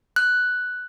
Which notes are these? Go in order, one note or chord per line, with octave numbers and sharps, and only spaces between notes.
F#6